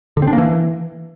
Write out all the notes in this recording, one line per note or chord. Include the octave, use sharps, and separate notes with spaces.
D3
C4
D4
A#3
E3